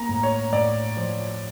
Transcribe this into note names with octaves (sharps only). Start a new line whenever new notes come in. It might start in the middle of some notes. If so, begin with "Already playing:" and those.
Already playing: A#3 A#5
A2
C#5
A2 D5
F3